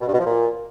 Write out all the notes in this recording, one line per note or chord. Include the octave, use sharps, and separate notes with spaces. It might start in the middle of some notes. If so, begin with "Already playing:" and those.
B2
G2
B2
F3
A#2